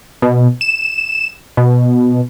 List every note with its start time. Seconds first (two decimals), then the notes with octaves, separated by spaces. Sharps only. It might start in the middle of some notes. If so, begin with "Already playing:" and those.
0.22 B2
0.61 E7
1.57 B2